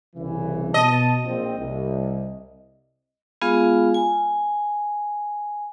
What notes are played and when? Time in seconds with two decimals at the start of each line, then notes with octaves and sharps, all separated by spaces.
0.16 C2 C#3 E3
0.74 B2 D#5 A5
1.24 A#1 C4
1.59 C2
3.42 G#3 B3 F4 G#4 F5
3.94 G#5